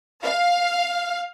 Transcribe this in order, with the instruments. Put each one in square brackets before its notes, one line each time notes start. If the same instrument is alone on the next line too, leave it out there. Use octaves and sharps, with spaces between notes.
[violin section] F5